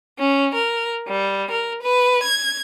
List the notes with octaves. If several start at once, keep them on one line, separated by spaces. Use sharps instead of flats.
C#4
A#4
G3
A#4
B4
G#6